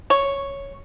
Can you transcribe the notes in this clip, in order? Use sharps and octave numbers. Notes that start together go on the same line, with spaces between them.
C#5